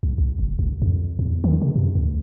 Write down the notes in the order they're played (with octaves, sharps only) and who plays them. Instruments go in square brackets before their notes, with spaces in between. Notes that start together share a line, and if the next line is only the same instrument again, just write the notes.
[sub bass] C2
C2
F#1
C#2
F2
E2
D#3
C3
F#2
D2